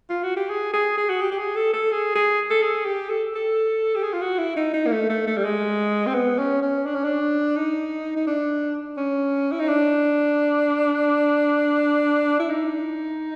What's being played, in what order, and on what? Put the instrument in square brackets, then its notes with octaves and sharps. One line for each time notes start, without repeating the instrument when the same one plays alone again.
[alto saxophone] F4
F#4
G4
G#4
G#4
G#4
F#4
G4
G4
G#4
A4
A4
G#4
G#4
A4
G#4
G4
A4
A4
G4
G#4
F4
F#4
E4
D#4
D#4
A#3
A3
A3
A3
G3
G#3
C4
B3
C#4
C#4
D4
C#4
D4
D#4
D#4
D4
C#4
E4
D#4
D4
E4
D#4